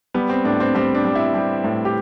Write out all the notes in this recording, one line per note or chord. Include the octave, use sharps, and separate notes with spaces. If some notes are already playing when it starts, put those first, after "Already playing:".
G3 B3
C4
A2 D4
C4
G3 C4
D4
G3
E4
G3
A2
G4